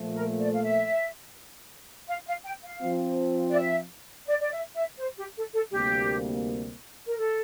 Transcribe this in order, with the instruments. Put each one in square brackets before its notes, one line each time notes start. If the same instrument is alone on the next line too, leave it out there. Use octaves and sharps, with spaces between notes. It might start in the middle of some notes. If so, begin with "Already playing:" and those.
Already playing: [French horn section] A#2 F3 A3
[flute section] A#4
D5
F5
E5
F5
F5
G5
F5
[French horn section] F3 C4 F4
[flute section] D5
E5
D5
D5
E5
E5
C5
G4
A4
A4
[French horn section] D2 C3 G3 A#3 [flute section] G4
[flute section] A#4
A4